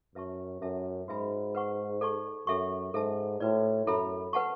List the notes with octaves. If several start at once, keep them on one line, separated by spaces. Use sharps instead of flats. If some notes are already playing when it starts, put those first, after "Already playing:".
F#2 B4 E5 A5 C#6
F#2 A4 E5 A5
G#2 F#4 B4 E5 G#5 B5
B4 F#5 C#6
A4 D5 A5 C#6
F#2 A4 E5 G#5 C#6
G#2 A4 E5 A5
A2 F#4 B4 D5
F#2 E4 A4 E5 B5
B4 F#5 A5 C#6